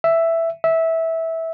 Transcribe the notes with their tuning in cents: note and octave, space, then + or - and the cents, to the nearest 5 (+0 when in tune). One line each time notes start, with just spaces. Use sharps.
E5 +5
E5 -15